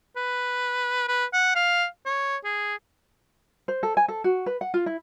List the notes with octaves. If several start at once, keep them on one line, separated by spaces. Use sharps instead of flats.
B4
B4
F#5
F5
C#5
G#4
C5
A4
G#5
A4
F#4
B4
F#5
F4
E4